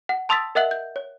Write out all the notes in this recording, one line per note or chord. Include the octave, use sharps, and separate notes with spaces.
F#5
A5 C6 D#6 E6 A6 B6
A#4 D#5 E5 F#5 F#6 F#7
G6
C#5